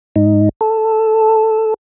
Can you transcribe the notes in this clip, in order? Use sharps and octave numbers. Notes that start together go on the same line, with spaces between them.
G#2 D#4
A4